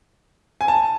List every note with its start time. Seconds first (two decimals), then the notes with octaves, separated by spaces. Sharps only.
0.61 G#5
0.68 A5